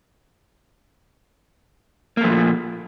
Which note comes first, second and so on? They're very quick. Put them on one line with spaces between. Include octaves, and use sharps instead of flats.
A#3 A3 F3 A#2